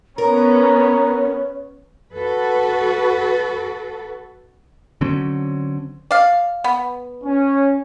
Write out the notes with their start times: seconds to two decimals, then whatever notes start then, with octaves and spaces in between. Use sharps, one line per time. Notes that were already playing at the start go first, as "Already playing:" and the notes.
0.18 B3 C#4 A#4 C#5 A#5
2.13 F#4 A4 B4
5.01 D3 F#3 C4 C#4
6.11 D5 F5
6.64 B3
7.24 C#4